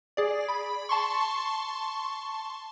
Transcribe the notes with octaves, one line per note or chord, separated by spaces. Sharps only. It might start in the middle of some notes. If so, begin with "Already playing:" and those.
G#4 D5
B5
A5 C6 C#6